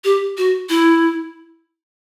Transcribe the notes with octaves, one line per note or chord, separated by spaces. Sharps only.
G4
F#4
E4